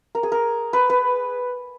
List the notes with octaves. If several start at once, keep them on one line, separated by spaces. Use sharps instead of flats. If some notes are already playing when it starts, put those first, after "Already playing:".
A#4
G#4
A#4
B4
B4